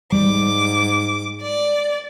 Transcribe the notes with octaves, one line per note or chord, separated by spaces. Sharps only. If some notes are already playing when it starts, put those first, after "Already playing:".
G#2 G3 D6
D5